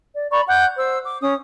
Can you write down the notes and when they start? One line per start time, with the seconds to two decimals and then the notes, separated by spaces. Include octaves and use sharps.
0.16 D5
0.31 D5 A#5 B5 C#6
0.48 F#5 D6 F#6 G6
0.77 C5 E6
1.03 D6
1.21 C#4 D#6